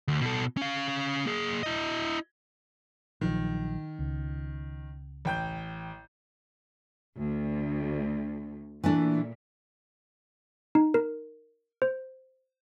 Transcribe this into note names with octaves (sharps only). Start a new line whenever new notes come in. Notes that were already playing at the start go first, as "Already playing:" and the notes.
D2
B2 A4
C#4 F5
A#3 G#4
E4 D#5
A#1 D#3 F3 F#3
C#2
A1 G5 G6
D2
A#2 E3 A3 D4
D#4
A#4
C5